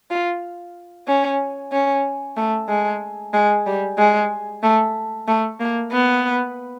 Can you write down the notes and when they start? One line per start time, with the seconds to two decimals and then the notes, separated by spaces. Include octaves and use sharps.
0.11 F4
1.08 C#4
1.72 C#4
2.37 A3
2.69 G#3
3.33 G#3
3.66 G3
3.98 G#3
4.63 A3
5.28 A3
5.60 A#3
5.92 B3